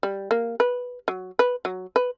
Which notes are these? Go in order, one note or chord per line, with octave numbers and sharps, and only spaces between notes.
G3
A#3
B4
F#3
B4
F#3
B4